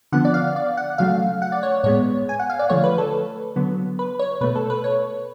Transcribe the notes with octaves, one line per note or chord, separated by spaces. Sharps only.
D3 F3 B3 F#5
D5
F5
D5
F#5
C#3 F#3 A3 F5
F#5
D5
C#5
A2 G#3 B3 C#5
G#5
F#5
F5
D5
D3 F3 A3 C#5
B4
A4
D3 F#3 B3
B4
C#5
B2 A3 B4
A4
B4
C#5